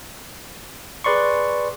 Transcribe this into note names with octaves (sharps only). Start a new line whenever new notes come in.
G#4 B4 D5 C6 C#6